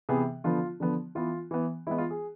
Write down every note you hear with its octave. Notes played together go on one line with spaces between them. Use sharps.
C3 E3 B3 G#4
D3 F3 B3 F4
D3 F3 B3
E3 B3 F4
E3 B3
E3 G#3 B3 E4
F4
G#4